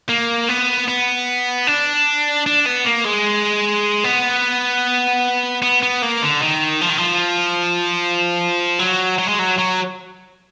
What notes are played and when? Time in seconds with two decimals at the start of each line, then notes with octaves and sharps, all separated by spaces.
0.09 A#3
0.49 B3
0.88 B3
1.67 D4
2.46 D4
2.66 B3
2.86 A#3
3.06 G#3
4.04 B3
5.62 B3
5.82 B3
6.02 A#3
6.22 D3
6.42 D#3
6.81 F3
6.89 D#3
6.98 F3
8.79 F#3
9.18 F#3
9.28 G#3
9.39 F#3
9.58 F#3